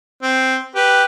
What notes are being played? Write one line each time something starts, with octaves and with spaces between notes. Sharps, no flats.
C4
G4 B4